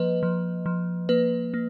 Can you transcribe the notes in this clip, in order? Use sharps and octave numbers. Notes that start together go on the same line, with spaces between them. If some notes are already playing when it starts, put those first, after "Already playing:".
Already playing: F3 A#3 B4 D#5
F3
F3
A#3 B4
A#3